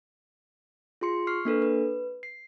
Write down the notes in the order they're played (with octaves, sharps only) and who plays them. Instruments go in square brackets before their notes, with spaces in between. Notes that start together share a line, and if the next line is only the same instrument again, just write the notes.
[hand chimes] F4 G#4 C6 C#7
C#6 F6 C7
A#3 D4 A4 B4
B4
C7